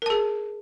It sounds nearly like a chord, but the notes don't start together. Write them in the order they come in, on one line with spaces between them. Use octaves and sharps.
A#4 A5 G#4